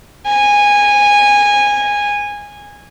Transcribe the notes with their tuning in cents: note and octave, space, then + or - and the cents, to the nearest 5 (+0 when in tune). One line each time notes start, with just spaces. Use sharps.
G#5 -15